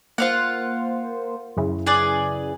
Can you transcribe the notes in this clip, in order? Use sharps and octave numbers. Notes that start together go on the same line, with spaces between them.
A#3 F4 C5 F5 F#5
F#2 C#3 E4
G#4 B4 D5